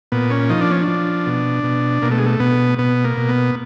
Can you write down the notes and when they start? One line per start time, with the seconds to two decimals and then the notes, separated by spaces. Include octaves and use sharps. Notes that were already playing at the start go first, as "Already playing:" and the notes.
0.12 A#2 B3
0.31 C#4
0.49 F3 D#4
0.61 D4
0.71 C#4
0.82 D4
0.88 F3
1.26 B2
1.64 B2
2.02 B2 A#3
2.11 A3
2.18 G#3
2.26 A3
2.40 B2 B3
2.78 B2 B3
3.04 A#3
3.17 B2
3.29 B3